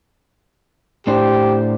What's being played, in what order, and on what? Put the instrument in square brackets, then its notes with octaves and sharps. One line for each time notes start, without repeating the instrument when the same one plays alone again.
[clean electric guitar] A2 D4 C5 [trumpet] G4